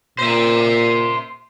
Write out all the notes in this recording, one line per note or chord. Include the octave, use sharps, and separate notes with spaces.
A#2 C5 E5